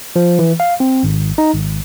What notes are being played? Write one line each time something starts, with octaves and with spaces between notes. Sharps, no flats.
F3
E3
F5
C4
G#1
D#4
G#1